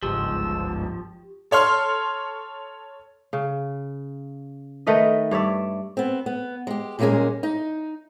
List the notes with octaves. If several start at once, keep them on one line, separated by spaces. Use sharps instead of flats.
G1 C#2 G#2 F3 G4 E6
A4 C#5 C6 F6
C#3
D#3 A3 B4 D#5
G2 C#5 D5 E5
B3 C4
B3
G#3 G4
A#2 G3 G#3 A#3 C#4 G#4
D#4